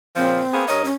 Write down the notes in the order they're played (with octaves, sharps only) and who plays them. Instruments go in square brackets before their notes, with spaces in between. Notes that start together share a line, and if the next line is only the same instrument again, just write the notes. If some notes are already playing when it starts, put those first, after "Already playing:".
[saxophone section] A#2 C#3 F3 [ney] C4
[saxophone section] A#3 B3 G#4
[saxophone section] G2 A#4 D#5 [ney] C#5
[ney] C#4